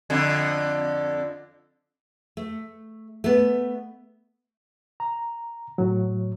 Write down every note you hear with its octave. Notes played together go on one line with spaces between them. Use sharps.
F2 D3
A3
A3 B3
A#5
A2 F#3